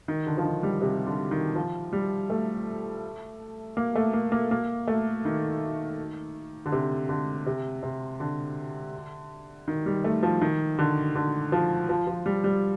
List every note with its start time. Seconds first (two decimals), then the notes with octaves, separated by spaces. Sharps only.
0.08 D#3
0.26 D3
0.37 F3
0.45 D#3
0.63 G3
0.82 C3
1.06 D3
1.31 D#3
1.55 F3
1.93 G3
2.30 A3
3.77 A#3
3.95 A3
4.13 A#3
4.32 A#3
4.51 A#3
4.87 A3
5.25 D#3
6.66 D3
6.72 C3
7.09 D3
7.46 C3
7.83 C3
8.20 D3
9.68 D#3
9.86 G3
10.04 A3
10.23 F3
10.41 D#3
10.79 D3
11.15 D3
11.52 F3
11.89 F3
12.07 F3
12.26 G3
12.44 G3